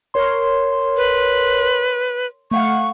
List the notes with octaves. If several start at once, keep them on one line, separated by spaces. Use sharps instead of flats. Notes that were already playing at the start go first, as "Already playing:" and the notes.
A#4 C#5 C6
B4
A3 F5 F#5 C#6